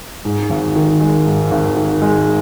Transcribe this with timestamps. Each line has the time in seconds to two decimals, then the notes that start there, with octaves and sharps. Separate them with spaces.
0.25 G#2
0.50 G#1
0.76 D#3
1.01 G#3
1.26 G#2
1.51 G#1
1.76 D#3
2.02 G#3